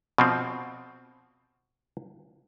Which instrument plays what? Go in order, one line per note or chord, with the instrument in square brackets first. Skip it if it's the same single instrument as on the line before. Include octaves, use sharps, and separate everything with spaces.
[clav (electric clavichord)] B2 F3 C4